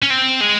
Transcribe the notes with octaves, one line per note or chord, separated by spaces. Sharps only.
C#4
C4
G#3